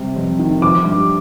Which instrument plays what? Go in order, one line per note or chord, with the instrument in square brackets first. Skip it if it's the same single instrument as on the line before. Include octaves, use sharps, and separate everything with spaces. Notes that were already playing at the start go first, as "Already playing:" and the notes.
Already playing: [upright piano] C3 G3
F2
D#3
F3 D6
G2